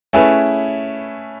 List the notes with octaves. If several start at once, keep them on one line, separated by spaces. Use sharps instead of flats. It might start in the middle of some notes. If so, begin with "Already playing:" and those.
A3 C#4 E4 G#4 B4